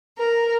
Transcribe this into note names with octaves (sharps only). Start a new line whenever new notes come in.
A#4